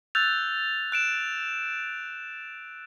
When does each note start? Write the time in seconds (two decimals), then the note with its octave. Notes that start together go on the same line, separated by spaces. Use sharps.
0.15 E6 F#6 G6 A6 F7
0.92 F#6 D7 E7